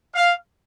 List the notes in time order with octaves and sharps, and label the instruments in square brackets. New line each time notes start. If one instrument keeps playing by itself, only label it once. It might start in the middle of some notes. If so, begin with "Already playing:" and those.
[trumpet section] F5